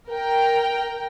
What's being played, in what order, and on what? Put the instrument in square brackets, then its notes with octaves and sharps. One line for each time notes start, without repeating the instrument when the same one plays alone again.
[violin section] A#4 G5